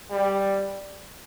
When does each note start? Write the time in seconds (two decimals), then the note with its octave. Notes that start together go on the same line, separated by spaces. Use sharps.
0.11 G3